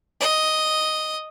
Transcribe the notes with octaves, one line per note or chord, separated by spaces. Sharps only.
D#5